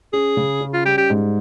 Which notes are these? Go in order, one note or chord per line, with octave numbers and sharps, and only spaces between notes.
C#4 G#4
C#3
C#4
F4
G3 G4
G4
G#2